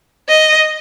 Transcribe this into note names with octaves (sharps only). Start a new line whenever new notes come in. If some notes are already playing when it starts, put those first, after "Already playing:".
D#5